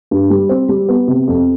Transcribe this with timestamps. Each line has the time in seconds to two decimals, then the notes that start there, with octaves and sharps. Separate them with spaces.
0.11 G2
0.30 G3
0.49 C4
0.69 G3
0.88 B3
1.07 C3
1.27 F2